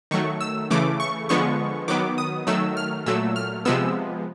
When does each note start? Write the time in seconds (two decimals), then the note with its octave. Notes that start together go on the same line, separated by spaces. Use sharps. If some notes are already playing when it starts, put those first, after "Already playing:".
0.11 D#3 F#3 A3 C#6
0.41 E6
0.70 C#3 E3 A3 D6
1.00 C#6
1.29 D3 F3 G#3 B3 C#6
1.88 D#3 F#3 B3 D6
2.18 D#6
2.47 D#3 F#3 A3 E6
2.77 F6
3.06 A#2 F#3 A3 E6
3.36 F6
3.65 C3 F3 G#3 B3 E6